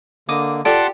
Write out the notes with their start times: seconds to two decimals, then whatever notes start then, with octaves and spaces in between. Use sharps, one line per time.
0.29 D3 A#3 D#5 D6
0.65 F4 G4 A4 D5 F#5 A5 C6 D7